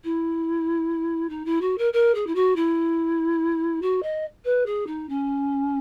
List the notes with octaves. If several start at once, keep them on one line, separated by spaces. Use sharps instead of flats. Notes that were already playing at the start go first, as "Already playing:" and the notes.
E4
D#4
E4
F#4
A#4
A#4
G#4
E4
F#4
E4
F#4
D#5
B4
G#4
D#4
C#4